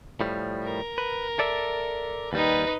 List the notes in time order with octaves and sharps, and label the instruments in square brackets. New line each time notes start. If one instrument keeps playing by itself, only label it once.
[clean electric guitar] A2 F3 G3
[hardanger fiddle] A#4
[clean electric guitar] B4
A4 D5 E5
[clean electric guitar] D#2 G3 [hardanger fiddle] D#4 B4